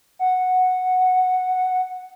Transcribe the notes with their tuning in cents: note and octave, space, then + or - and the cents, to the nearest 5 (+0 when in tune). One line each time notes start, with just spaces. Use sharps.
F#5 -5